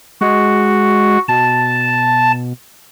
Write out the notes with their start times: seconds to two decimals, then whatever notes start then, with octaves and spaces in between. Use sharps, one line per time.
0.21 G#3 F#4
1.28 B2 A5